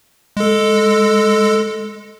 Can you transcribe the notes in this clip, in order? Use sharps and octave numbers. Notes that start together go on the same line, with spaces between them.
G#3 A4